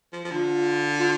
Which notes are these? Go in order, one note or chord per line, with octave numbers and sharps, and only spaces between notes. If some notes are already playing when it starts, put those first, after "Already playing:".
F3
F3
D3 F4
F4